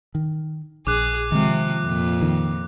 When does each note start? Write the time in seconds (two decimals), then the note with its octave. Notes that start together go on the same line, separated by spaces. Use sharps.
0.15 D#3
0.87 A#1 G#4 D6 F#6
1.32 C3 D#3 F3 G#3
1.84 F2 A#2
2.22 D#3